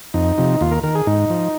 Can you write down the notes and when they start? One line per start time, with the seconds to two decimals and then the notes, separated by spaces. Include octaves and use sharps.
0.14 F2 D#4
0.38 C3 F3
0.61 D#2 F4
0.72 A#4
0.83 D#3 A#4
0.95 G#4
1.07 G#2 D#4
1.30 F3